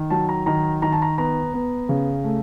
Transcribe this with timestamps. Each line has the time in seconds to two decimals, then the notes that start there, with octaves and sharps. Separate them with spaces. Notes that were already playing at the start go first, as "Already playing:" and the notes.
Already playing: D#3
0.10 F#3 A5
0.29 A#5
0.46 D#3 A#5
0.82 D#3 A#5
0.92 A5
1.02 A#5
1.18 B3 A#5
1.54 B3
1.89 C#3
2.24 A3